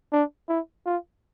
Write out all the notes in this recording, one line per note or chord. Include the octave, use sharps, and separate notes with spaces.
D4
E4
F4